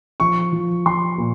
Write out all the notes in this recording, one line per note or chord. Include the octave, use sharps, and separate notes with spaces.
F3 C#6
F3
F3 C6
A#2